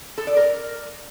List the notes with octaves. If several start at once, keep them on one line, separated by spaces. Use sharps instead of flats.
A4
D5
A#4